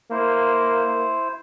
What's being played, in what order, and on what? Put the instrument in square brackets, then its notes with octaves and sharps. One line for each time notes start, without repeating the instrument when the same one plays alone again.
[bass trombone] A#3 [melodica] E4 C5